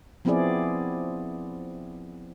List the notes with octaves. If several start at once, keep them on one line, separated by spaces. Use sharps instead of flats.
F3 B3 C4 E4 G#4 D5